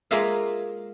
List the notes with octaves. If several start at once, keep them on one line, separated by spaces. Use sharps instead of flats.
G#3 A#3 F4 G#4 E5 F5